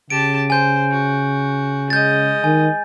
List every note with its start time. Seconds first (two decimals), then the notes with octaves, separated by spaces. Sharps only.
0.10 C#3 G4 A5 D7
0.50 C5 G#5 G6
0.91 F#4
1.90 G#3 D#5 G6 A6
2.44 D#3 G#5